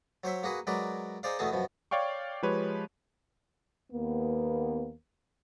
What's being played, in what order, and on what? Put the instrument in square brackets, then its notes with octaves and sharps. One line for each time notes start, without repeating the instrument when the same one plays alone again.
[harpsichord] F#3 C5 C#5 E5
A#3 F#4 G#4 B4
F#3 G#3 A#4 B4 D5
D#4 G#4 C5 D5 F5
E2 B2 A3 B3 G#4 A5
F#2 B2 F3
[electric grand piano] C#5 D5 F5 G5 C#6
F3 G#3 G4 B4 C#5
[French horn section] D#2 A#3 B3